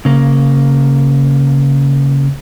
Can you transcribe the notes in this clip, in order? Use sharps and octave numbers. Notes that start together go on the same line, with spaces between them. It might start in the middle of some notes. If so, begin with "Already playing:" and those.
C#3 A#3